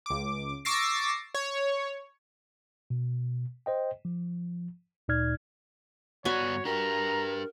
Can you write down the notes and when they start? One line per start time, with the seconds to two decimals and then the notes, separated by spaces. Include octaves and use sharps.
0.06 C#2 D6
0.65 C#6 D6 E6 A6 A#6 C7
1.35 C#5
2.90 B2
3.66 C5 D#5 G5
4.05 F3
5.08 D2 A#2 D#4 D5 F6 G#6
6.25 G2 B3 F#4 C#5 D5 G#5 B5
6.65 D4 G4 A#4 A#5